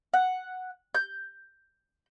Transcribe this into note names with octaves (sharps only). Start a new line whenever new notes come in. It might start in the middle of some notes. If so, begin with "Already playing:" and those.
F#5
G6